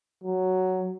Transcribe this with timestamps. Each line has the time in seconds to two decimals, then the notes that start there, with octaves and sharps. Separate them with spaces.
0.24 F#3